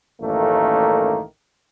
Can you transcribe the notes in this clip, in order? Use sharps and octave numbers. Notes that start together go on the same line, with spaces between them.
A1 F#2 D#3 A3 A#3